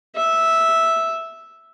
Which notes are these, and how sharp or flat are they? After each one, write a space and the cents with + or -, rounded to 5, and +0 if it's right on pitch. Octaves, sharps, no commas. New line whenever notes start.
E5 -5